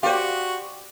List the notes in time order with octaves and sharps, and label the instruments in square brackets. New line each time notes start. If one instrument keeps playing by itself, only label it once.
[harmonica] F#4 [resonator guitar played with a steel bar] G4 [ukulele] C5 F5 [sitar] D5